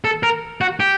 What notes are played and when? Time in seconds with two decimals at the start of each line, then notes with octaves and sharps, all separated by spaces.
0.04 A4
0.23 A#4
0.61 F#4
0.80 G4